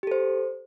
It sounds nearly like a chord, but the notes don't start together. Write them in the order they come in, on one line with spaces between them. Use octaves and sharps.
G4 A4 C5